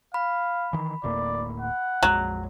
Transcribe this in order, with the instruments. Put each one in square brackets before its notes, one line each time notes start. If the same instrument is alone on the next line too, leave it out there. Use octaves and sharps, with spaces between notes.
[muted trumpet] F5 [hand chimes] B5
[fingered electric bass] D#3 E3
[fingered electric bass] D1 A2 A#3 [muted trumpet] D5
[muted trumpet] F#5
[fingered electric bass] A#1 F2 G#3 [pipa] F#3